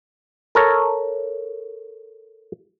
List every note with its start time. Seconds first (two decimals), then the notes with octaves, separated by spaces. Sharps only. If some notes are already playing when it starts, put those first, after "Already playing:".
0.55 A4 A#4 C#5